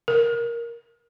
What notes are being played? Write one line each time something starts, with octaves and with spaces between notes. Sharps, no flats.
A#4